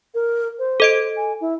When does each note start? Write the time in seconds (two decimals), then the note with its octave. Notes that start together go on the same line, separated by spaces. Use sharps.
0.15 A#4
0.59 C5
0.80 A4 D#5 D7
1.16 G#5
1.41 E4